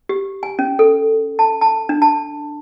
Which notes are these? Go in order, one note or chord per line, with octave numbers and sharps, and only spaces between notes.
G4
G#5
C#4
A4
A5
A5
D4
A5